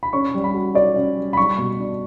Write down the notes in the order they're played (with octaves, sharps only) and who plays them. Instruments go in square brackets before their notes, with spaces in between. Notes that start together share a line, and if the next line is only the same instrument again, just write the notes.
[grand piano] B5
[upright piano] C#4 [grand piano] C#6
[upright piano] G3
[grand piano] B5
[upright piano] F#4
[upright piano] C#5 [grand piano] D5
[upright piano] C#4
G3
[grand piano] B5
[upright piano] G3 [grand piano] C#6
[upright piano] B2
D4